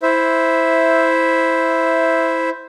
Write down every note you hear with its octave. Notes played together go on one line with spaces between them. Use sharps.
E4 C5 E5